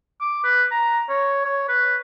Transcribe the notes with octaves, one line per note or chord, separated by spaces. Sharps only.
D6
B4
A#5
C#5
C#5
B4